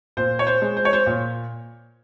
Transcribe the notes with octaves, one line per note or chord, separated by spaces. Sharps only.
A#2 C5
C#5
C5
G#3
C5
C#5
C5
A#2